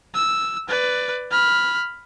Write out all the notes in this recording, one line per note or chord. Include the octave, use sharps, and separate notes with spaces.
E6
B4 D5
B5 F6